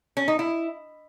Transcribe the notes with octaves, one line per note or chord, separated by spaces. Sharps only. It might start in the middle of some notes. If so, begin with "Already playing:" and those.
C#4
D#4
E4